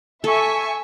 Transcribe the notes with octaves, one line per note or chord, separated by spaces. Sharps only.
A4 E5 G#5 C#6